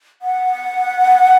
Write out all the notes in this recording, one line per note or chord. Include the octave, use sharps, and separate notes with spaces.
F#5